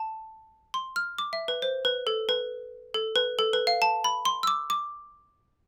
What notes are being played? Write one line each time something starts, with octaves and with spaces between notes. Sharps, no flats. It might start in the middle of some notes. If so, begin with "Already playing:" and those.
Already playing: A5
C6
F6
D6
E5
B4
C5
B4
A4
B4
A4
B4
A4
B4
F5
A5
B5
C6
E6
D6
D6